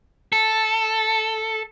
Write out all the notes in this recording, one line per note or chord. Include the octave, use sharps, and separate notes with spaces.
A4